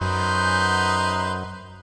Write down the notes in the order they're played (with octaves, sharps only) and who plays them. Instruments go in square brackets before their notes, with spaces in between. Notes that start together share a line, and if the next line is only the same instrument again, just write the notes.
[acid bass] F#2 [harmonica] D#4 B4 C5